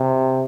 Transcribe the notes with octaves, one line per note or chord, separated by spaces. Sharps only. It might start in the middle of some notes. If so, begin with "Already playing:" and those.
Already playing: C3